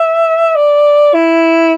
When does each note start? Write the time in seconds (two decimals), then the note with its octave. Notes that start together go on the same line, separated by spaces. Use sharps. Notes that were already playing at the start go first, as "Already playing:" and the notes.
Already playing: E5
0.56 D5
1.14 E4